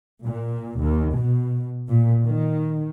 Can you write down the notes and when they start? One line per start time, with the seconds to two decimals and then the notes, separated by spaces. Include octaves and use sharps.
0.24 A#2
0.80 D#2
1.13 B2
1.88 A#2
2.25 D#3